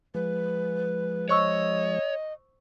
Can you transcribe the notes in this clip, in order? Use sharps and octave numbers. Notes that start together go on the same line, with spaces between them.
F3 G#3 B4
C5 C#5 D#5 C#6 E6